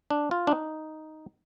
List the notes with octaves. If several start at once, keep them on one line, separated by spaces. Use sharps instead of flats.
D4
F4
D4
D#4